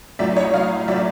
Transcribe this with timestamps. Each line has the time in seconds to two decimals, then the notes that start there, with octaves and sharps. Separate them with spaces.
0.19 A2 F#3 D5 E5
0.36 C#5 D#5
0.54 A2 F#3 D#5 F5
0.88 A2 F#3 D5 E5